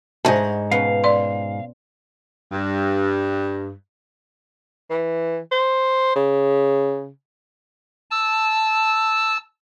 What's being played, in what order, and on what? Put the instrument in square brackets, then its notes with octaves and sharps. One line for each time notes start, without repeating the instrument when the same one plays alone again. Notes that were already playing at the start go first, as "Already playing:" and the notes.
[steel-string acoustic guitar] F2 G#2 [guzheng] C#5 D#5 [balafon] A5
[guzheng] B2 B3 C#4 [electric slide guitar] F5
[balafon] D5 C6
[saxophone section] G2
[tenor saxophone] E3
C5
C#3
[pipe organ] A5 E6